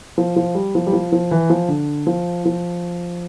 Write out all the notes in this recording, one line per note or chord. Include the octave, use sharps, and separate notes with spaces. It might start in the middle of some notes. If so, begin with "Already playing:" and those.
F3
F3
G3
F3
G3
F3
F3
E3
F3
D3
F3
F3